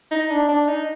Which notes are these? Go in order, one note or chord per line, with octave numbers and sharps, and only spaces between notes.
D#4
D4
D4
D#4